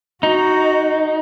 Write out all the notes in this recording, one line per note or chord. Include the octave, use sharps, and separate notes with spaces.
D#4 F#4